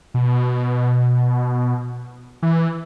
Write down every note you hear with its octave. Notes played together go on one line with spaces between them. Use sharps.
B2
E3